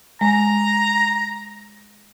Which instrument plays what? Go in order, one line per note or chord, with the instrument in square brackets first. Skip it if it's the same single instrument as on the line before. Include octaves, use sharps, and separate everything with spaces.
[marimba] G#3 [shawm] A#5